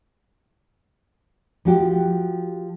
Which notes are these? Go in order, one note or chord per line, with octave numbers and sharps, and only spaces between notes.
F3 F#4 G4